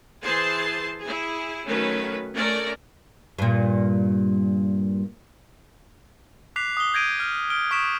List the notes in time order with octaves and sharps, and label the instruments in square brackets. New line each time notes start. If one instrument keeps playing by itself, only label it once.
[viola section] E3 G#4 C5 A5 C6
E4 G#4
D#3 F#3 A3 C#4 B4
A3 C#4 A#4 D5
[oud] G2 A#2
[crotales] D6 F#6 B6 C7 F7
D#6 G7
G6 G#6 A#6 D7 D#7
F6
F6 D7 G7
C#6 D#6 B6 D7 E7